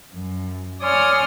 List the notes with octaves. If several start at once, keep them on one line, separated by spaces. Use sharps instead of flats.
F#2
C#5 D5 G#5 C6 D#6 F6